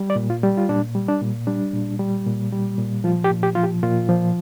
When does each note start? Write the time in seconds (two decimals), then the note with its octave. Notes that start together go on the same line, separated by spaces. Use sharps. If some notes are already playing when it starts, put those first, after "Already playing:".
Already playing: G3
0.10 D5
0.16 A#2
0.30 F4
0.43 G3
0.57 F4
0.69 A#2 D4
0.95 G3
1.08 D4
1.21 A#2
1.47 G3 D4
1.73 A#2
2.00 G3
2.26 A#2
2.52 G3
2.78 A#2
3.04 F3 F4
3.24 G4
3.30 A#2
3.43 G4
3.55 F3 F4
3.63 G4
3.83 A#2 F4
4.09 F3